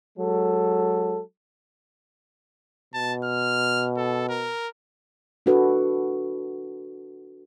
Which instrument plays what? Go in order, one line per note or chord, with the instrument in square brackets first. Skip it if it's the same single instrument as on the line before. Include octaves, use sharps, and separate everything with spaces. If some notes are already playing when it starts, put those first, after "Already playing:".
[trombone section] F#3 G#3 A4
[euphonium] B2 [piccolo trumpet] A5
[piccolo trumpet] F6
A4
A#4
[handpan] D4 E4 F#4 A4 B4